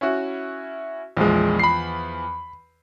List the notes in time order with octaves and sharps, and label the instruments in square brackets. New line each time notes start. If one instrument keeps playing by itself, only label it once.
[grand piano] C#4 E4 F#4
[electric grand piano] A#1 G#3 [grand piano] E2 F3
[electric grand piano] B5 C7